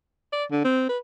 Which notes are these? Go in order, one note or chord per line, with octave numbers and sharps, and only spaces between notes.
D5
D3
C4
B4